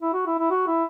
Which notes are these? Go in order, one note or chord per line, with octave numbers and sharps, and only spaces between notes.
E4
F#4
E4
E4
F#4
E4